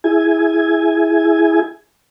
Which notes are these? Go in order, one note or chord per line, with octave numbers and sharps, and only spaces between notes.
E4 G#4 G#5